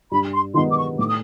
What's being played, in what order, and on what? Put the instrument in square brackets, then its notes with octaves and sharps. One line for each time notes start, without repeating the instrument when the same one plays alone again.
[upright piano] G2 [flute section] B5
[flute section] C6
[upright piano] D#3 G#3 B3 D#4 [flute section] C6
[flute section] D6
C#6
[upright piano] A2 [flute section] D6
[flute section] D#6